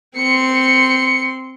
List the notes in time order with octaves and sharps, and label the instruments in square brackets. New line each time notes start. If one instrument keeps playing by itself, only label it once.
[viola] C4 C6 [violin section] C#7